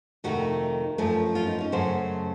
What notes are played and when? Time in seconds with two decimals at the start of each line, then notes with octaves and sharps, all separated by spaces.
0.24 F2 C3 D#3 A3 F#4
0.98 F#2 F3 A3
1.35 F4
1.47 D#4
1.61 C#4
1.72 F#2 C#3 F#3 A3 C5